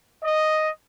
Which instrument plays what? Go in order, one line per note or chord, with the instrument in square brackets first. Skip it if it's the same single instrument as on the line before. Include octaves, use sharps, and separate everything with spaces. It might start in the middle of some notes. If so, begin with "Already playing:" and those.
[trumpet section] D#5